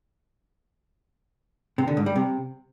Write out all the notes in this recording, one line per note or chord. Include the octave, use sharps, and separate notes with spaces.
C3
D3
G#2
G3
C3